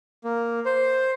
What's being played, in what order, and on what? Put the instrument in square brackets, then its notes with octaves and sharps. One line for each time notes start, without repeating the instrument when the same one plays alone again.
[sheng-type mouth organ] A#3
C5